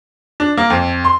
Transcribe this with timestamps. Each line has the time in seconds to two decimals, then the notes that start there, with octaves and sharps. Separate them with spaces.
0.40 D4
0.57 A#3
0.70 F2
1.04 C6